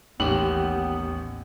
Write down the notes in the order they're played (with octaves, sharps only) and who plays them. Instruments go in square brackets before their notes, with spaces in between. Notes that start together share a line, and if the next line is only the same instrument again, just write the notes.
[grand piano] A1 G4 F#7 [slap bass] D#2 [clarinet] B3